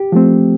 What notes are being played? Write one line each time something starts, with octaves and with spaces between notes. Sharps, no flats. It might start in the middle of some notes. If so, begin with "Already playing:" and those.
Already playing: G4
F3 A3 C4